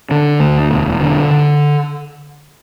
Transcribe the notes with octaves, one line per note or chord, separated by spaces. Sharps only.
D3
D2
E1
D3
D3